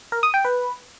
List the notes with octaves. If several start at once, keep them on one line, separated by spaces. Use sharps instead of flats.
A#4
D#6
G5
B4